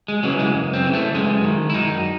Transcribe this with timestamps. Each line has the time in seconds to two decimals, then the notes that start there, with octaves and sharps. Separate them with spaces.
0.08 G#3
0.23 C#3 E3 F#3
0.39 G#3
0.54 F#2
0.73 C4
0.83 C#3 E3
0.93 A3
1.14 F#2 G#3
1.44 D#3
1.70 E4
1.74 F#2 D#4